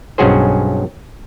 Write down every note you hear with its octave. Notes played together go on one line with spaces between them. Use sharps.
B1 G2 C#4 F#4 G#4 C5